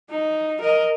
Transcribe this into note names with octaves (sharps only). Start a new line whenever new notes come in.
D#4
A#4 D#5